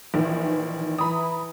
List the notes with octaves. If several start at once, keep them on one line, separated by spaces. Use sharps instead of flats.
A#1 D#3 E3
E3 A#5 B5 D#6